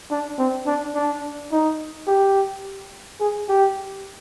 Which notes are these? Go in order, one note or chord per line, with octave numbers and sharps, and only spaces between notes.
D4
C4
D4
D4
D#4
G4
G#4
G4